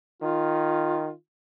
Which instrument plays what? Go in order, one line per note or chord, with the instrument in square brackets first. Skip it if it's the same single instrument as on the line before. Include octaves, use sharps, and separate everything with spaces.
[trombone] D#3 [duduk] F4